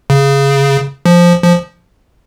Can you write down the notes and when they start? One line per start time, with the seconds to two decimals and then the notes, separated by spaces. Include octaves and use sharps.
0.10 C#3
1.06 F3
1.44 F3